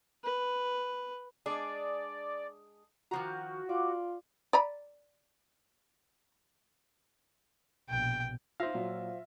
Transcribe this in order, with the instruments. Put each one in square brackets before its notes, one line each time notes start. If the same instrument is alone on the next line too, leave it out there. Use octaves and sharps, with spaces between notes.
[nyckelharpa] B4
[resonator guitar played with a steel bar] G#3 D4 G#4 [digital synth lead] D5
[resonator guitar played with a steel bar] D#3 F3 A#5 [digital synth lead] F#4
[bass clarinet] F4 [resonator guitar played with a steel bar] D5
[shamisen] D5 A#5 B5
[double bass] A#1 B2 [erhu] G5
[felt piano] D#4 A#6 [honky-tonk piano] F4 E5 [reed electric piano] C5 F5
[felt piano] A#2 F#3